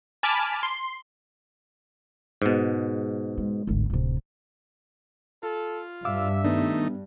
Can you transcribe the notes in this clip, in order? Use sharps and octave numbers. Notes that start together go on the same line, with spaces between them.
G#5 A5 B5 D6 F6
C6
G#2 B2
G#3
D1 G#1
D1 C3
F4 A4
G2 E5 F5 D6 E6
D#3 A3 B3 D4 D#4